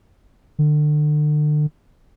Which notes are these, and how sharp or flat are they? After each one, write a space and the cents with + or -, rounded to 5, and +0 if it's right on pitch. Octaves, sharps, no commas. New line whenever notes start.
D3 +35